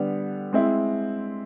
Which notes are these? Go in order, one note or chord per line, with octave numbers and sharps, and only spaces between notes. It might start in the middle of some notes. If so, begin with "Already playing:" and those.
Already playing: D3 G3 B3
G#3 C4 E4